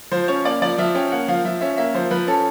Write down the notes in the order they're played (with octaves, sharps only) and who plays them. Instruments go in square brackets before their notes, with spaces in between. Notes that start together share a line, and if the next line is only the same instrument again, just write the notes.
[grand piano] F3 C5
C#4 C#5
A#3 D5
F3 D5
F3 E5
C#4 G5
A#3 F#5
F3 F5
F3 E5
C#4 E5
A#3 E5
F3 C5
F3 B4
C#4 A4